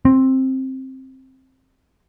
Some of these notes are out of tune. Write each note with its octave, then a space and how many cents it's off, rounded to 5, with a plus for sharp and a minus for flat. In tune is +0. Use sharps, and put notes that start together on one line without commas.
C4 +10